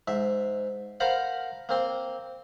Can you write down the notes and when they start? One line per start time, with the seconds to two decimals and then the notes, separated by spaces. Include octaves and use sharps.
0.08 G#2 E5
1.00 A#4 C5 F5 F#5 A5 B5
1.69 A#3 C4 C6